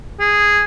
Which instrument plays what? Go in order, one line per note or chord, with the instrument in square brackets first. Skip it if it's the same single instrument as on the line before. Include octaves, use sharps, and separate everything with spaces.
[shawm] G#4